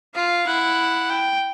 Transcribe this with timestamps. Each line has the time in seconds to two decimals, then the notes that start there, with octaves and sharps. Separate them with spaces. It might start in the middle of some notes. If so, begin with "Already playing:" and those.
0.15 F4 F5
0.46 E4 F#5
1.10 G5